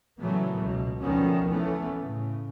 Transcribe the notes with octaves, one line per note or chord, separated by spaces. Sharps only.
A#2 C#3 E3 F#3 A3 B3
C#2 B2
D2 D#3 F3 A3 B3 C#4
E3 A3 B3 C#4
A2 C#3